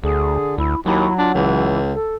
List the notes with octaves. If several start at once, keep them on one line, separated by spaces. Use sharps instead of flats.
D2 D3 G#4
D2 E4
D#2 F#3 E4
D4 F4
C#2 E3
A4